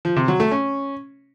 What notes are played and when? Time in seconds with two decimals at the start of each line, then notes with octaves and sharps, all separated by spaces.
0.05 F3
0.16 C3
0.28 F#3
0.40 A3
0.51 C#4